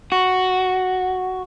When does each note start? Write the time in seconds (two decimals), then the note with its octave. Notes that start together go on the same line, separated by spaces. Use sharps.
0.12 F#4